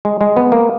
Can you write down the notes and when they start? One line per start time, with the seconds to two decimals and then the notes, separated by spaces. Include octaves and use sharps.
0.05 G#3
0.21 G#3
0.36 B3
0.52 A#3